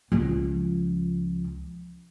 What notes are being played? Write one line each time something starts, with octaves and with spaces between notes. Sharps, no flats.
C#2 F3